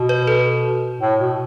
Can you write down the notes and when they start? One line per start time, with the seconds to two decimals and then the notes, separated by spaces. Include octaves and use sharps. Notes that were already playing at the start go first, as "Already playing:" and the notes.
Already playing: B2
0.09 B4
0.27 A4
1.01 A2
1.19 B2